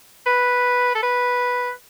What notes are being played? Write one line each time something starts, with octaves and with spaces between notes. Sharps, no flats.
B4
A4
B4